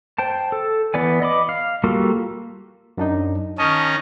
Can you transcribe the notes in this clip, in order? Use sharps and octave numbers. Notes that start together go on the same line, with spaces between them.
C5 G5 A5
A4
E3 B3 D5 G#5
D#5 B5 D6
F5
G3 A#3 F4 F#4 A4
F#2 D4 D#4
D#3 C#4 D#5 A5 C#6